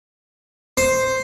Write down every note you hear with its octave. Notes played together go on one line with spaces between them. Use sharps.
C5